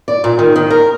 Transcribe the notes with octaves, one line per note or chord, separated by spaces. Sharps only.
D5
A#2
D#3
D#3
A#4